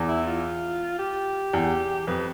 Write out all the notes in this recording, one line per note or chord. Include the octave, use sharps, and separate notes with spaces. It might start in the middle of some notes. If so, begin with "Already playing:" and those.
Already playing: E2
E4
F4
G4
E2
F2 B4